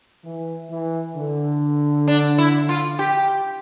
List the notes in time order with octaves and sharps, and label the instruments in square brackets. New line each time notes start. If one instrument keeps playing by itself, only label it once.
[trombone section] E3
E3
D3
[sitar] D4
E4
F4
G4